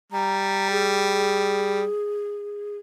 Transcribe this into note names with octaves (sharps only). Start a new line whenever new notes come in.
G3 A#5
G#4